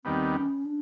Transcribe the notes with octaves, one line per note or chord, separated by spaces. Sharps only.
D#2 D#3 G3 B3 C4
C#4
D4